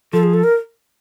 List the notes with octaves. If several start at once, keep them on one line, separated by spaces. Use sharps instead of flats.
F3 A4
G#4
A4
A#4